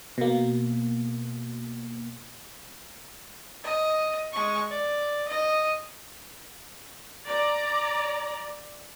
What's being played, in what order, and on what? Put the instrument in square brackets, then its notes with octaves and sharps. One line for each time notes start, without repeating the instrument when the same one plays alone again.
[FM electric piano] B2 A#3
[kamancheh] D#5
G#3 C#6
D5
D#5
[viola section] D5 A#5